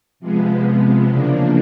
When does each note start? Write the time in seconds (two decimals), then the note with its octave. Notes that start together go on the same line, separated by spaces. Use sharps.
0.20 C3 F3 G#3 B3
1.07 E2 C#3 F3 A#3 D4